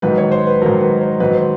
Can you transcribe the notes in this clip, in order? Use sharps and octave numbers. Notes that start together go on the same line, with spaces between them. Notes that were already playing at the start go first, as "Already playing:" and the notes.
G#2 D#3 F#3 B4
C#5
C5
B4
G#2 D#3 F#3 A#4
B4
C5
G#2 D#3 F#3 B4
C5